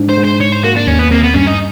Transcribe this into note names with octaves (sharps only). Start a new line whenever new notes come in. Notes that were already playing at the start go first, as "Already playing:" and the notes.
Already playing: G#2 D4
C5
G#2
C5
G#2 C#5
C5
A#3 F#4
D4
D#2 C#4
B3
A#3 C4
B3
G2 C#4
D#4